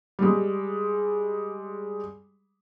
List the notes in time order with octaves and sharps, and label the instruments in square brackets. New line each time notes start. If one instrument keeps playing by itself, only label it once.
[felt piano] G3 G#3